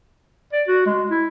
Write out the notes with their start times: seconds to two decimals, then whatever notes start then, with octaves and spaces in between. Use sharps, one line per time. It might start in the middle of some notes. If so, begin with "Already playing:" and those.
0.53 D5
0.67 F#4
0.86 G#3
1.10 E4